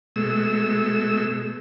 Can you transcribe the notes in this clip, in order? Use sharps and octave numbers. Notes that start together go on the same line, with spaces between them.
B2 G#3 A3 E6